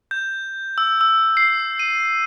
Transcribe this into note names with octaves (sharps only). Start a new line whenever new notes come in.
G6
E6
E6
C7
D#7